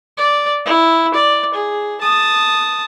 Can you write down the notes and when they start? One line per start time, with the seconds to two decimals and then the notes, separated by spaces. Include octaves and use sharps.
0.17 D5
0.65 E4
1.14 D5
1.54 G#4
2.01 A5 D#6